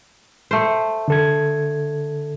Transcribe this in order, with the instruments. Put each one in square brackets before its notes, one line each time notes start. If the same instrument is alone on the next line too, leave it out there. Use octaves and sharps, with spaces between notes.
[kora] A3 C5
[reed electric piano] D3 A4 G#6